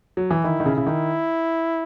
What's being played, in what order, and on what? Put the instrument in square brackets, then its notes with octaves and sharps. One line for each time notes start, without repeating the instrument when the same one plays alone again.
[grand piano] F#3
E3
[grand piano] D#3 [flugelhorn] E4
[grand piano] D#3
C#3
[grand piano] C#3 [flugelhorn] E4
[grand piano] D#3